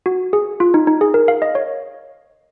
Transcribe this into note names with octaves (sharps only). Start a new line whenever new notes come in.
F#4
G#4
F4
D#4
D#4
G#4
A#4
F5
D#5
C#5